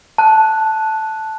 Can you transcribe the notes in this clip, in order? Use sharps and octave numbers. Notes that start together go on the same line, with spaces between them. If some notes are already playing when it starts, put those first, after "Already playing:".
A5 F#6